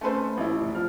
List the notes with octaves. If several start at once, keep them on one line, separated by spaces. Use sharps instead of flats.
A3 C4 C#4 A4 B4 C5
A1 E4
F1
F3 F6